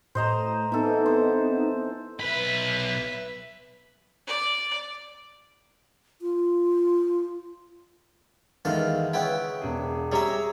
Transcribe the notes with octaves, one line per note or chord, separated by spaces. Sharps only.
A2 C5 D#5 A#5
E3 B3 C4 D#4 A4
C5
B1 B4 E5 B5
D5
F4
E2 D#3 E3 G#3 A4 F5
C#3 B3 E4 G5
E1 G#4
G3 G#4 C#5 E5 A#5